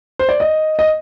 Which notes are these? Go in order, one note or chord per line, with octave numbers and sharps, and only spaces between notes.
C5
D5
D#5
D#5